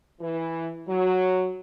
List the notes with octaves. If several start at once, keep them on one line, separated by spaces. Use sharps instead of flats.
E3
F#3